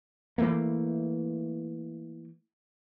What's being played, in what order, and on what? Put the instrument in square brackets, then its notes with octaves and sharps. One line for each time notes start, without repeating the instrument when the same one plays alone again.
[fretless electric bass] E3 F#3 A3 A#3